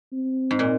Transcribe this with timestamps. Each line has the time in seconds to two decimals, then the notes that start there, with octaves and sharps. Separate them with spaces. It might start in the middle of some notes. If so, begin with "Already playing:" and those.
0.13 C4
0.51 G#2
0.59 A#2